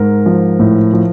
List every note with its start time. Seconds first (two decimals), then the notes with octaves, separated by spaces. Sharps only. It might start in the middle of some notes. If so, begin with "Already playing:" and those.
Already playing: G#2 A#4
0.26 F3
0.59 A2
0.93 F3